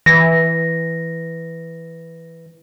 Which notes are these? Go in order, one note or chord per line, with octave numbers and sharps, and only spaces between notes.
E3 A#6